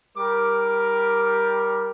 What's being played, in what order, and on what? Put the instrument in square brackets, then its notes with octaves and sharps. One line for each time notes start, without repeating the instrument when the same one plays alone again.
[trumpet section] G3 A#4 [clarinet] D6